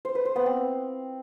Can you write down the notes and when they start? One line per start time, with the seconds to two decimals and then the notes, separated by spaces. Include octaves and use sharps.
0.05 C5
0.15 B4
0.25 C5
0.36 B3
0.46 C4